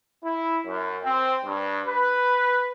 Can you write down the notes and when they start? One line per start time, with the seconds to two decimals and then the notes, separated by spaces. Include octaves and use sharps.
0.24 E4
0.66 F#2
1.04 C4
1.44 G2
1.86 B4